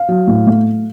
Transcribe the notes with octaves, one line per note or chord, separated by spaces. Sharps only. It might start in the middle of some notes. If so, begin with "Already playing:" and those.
Already playing: F5
F#3
A2
A3